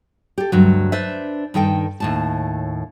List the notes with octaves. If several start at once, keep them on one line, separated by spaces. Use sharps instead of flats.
G4 A4
D2 G2 F#3
D4 B4 C5 E5
G2 D#3 A4 G5
D#2 A2 A5